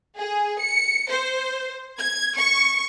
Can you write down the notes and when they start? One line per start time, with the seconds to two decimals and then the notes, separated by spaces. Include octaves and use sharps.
0.18 G#4
0.61 C#7
1.10 C5
1.98 G#6
2.36 C#6